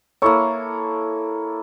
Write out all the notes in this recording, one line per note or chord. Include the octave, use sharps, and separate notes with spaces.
A#3 E4 A4 C#5 C#6